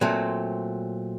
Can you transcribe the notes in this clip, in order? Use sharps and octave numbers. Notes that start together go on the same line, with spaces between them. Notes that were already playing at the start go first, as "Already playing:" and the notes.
A#2 F#3 A3 C4